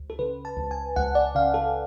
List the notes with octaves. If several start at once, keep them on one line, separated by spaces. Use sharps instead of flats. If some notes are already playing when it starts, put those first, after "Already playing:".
Already playing: C#2
A4
C#3 B4
A5
C#2
G#5
C#2 F#5
D5
C#3 F5
A4